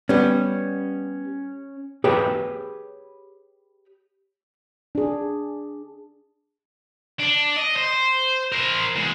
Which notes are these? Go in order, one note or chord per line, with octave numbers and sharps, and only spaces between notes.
G3 B3 C#4
G4 G#4 B4 C#5 G5
D4 G#4
D4
D#5
C5
A#4 C5
E2 G#3